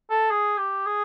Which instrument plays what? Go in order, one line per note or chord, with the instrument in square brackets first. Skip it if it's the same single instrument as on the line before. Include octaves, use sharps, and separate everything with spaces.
[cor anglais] A4
G#4
G4
G#4